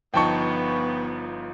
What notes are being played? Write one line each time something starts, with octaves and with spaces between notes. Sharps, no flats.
G1 F3 B3 D#4 G5 A5 C#6